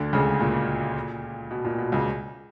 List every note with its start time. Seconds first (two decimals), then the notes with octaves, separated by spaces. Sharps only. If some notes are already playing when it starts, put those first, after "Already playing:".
Already playing: D2 D3
0.13 C#2 C#3
0.41 A#2
1.51 B2
1.65 A#2
1.78 B2
1.92 C#2 C#3